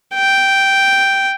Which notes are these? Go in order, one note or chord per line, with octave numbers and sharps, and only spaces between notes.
G5